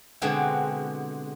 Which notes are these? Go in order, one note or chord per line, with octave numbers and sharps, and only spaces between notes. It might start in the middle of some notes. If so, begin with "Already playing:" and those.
B2 D3 G#3 C4 F#4 G4